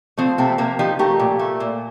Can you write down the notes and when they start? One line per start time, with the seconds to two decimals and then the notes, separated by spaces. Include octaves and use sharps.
0.18 F3 A3 C4
0.38 C3 A3 C4
0.58 C3 A#3
0.79 F3 D#4 G4
0.99 A3 G4 A#4
1.19 A#2
1.39 A3
1.60 A#2